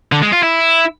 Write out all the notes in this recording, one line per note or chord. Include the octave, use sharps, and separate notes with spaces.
D3
G#3
F4
E4